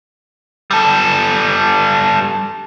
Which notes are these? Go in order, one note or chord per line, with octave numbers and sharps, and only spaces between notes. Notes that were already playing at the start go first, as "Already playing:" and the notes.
G3 A4